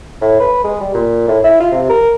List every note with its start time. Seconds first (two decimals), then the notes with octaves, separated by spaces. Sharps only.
0.21 A2
0.40 B4
0.64 G#3
0.81 G3
0.94 A#2
1.28 A2
1.44 E4
1.60 F4
1.72 C3
1.89 A#4